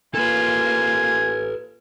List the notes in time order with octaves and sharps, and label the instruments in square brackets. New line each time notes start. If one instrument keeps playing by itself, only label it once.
[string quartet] A#3 F4 [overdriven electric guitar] A4 B4 [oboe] G#5